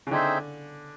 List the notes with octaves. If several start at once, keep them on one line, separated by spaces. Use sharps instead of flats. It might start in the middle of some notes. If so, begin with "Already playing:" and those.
C#3
D3 C4 D#4 G#4 C5 E5